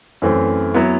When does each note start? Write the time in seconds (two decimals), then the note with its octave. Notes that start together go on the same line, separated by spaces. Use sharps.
0.22 F#2 E3 A3 C4
0.74 F#3 B3 E4